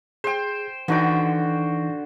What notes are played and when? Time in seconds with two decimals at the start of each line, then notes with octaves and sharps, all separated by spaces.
0.24 G#4 C5 G5
0.88 D3 E3 D#4 F#4 G5